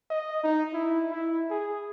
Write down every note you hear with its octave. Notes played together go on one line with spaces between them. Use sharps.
D#5
D#4
E4
E4
G#4